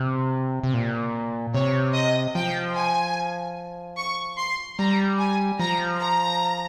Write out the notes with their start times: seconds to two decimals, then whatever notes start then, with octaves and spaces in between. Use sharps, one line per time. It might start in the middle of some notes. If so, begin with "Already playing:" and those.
Already playing: C3
0.64 C3
0.74 A#2
1.54 C3 C#5
1.94 D#5
2.35 F3 G5
2.75 G#5
3.98 C#6
4.38 C6
4.79 G3 A#5
5.19 G#5
5.60 F3 A#5
6.00 A#5